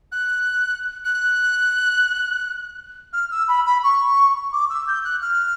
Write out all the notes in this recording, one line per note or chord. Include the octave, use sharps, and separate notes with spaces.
F#6
F#6
F6
E6
B5
B5
C#6
D6
E6
G6
F#6
F6